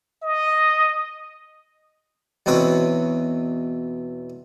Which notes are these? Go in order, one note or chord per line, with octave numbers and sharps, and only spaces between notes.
D#5
E2 B2 C4 B4 C#5